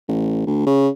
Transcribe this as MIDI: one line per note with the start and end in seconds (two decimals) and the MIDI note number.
0.08 0.42 33
0.47 0.62 38
0.66 0.88 49